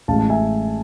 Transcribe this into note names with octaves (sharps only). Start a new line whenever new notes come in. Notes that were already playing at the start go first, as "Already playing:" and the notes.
A1 A2 G#3 F5 A5
F5 A5
E5 G#5